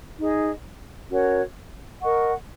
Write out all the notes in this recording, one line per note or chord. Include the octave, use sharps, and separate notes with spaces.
D#4 G#4 D#5
C#4 F#4 A#4 C#5
A#4 D#5 F#5 C#6